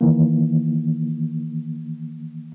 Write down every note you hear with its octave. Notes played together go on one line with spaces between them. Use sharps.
D#3 E3 A#3